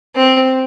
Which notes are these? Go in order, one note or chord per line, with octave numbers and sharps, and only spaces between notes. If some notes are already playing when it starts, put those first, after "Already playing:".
C4